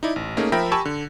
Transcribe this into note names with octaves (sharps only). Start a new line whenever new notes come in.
D#4 E4 D5
A1
A3 A#3 C#4 D#4 G#4
F3 A#4 E5 G5 B5 A#6
G4 G#5 A5 B5 C#6 E6
D3